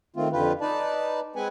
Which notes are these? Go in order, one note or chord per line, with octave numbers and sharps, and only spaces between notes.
D#3 A3 C4 F4
F2 D3 F4 G4 B4
D#4 B4 D5 A5
G#3 C4 B4 F#5 G#5